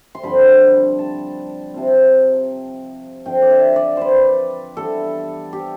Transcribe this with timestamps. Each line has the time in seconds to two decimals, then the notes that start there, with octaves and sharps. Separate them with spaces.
0.15 C6
0.23 G2 D3 F3 C4 B5
0.99 A5
1.74 C3 F3 C4
3.26 D3 F3 C4 G5
3.42 D5
3.51 E5
3.76 D5
3.97 B4 C5
4.77 E3 G3 B3 D4 A4
5.53 G4